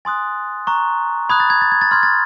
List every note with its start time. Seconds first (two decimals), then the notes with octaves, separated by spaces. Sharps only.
0.05 G#5 C6 D#6 F#6 A6
0.67 A#5 C#6 F#6
1.30 B5 D#6 F#6 G#6
1.40 A6
1.50 G#6
1.61 A6
1.72 G#6
1.81 A6
1.91 C6 F6 G#6
2.03 A6